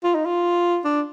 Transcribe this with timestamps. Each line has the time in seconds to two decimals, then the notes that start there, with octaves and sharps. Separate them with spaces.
0.04 F4
0.15 D#4
0.26 F4
0.85 D4